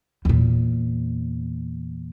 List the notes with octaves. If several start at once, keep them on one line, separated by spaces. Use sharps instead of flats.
E2 A#2